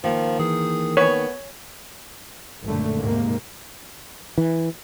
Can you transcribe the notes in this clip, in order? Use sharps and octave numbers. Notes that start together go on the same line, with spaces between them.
D#3 F3 A#3
E3 G#4
B3 C#5
G#1 F#2 A#2 D3 A3
D#2 G#2 C3 A#3
E3